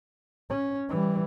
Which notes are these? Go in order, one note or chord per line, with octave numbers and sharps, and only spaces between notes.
C#4
E3 G3